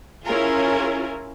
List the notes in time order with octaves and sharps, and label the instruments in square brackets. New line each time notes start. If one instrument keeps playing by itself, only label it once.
[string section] C#4 E4 F4 G#4 A#4